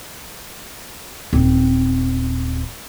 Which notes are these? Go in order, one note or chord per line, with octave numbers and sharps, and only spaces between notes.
D#1 C4